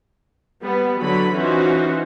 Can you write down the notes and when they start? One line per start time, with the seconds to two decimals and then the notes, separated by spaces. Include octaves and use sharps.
0.62 G3 B3
0.99 D3 F#3 B5
1.34 E3 C#4 D#4 F4 F#4 C5